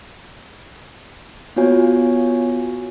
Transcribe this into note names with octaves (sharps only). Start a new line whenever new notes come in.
B3 F4 F#4 C#5 G#5